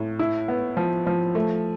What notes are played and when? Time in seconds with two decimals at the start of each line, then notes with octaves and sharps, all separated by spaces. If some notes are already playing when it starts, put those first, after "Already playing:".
Already playing: A2
0.19 E4
0.48 B3
0.77 F3
1.07 F3
1.35 A3